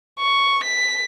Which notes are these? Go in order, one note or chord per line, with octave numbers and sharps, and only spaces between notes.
C#6
B6